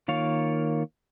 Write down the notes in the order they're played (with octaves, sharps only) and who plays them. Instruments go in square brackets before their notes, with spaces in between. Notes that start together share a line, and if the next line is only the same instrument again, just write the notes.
[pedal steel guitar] D#3 A#3 F4 C#5 F5